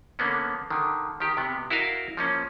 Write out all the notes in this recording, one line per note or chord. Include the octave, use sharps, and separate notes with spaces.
D3 A#3 B3 C#4
D3 D#3
D#3 G4
C3 B3
E4 F#4 A#4 D#5 F5
F3 A#3 C#4